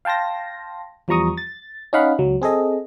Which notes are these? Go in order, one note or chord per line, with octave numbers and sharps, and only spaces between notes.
F5 G5 A5 C6 A#6
E2 F3 G3 A#5 C#6 D#6
A6
C#4 D#4 D#5 F5 F#5 B5
C#2 F#3
C4 G#4 A4 D#5